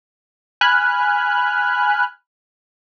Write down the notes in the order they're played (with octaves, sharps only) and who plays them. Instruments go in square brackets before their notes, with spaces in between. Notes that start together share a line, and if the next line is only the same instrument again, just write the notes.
[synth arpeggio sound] G#5 B5 F6 F#6